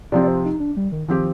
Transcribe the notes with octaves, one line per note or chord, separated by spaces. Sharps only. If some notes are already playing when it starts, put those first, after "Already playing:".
C3 F3 C4 D5
D5
C5
D#4
D4
G3
D#3
D#3 F3 C4 G4